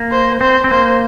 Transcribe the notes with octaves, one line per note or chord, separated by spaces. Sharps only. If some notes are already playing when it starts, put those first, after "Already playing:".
Already playing: A#3
C5
C4 C5
C4
A#3 C5